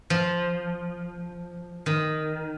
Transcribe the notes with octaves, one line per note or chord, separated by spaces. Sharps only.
F3
D#3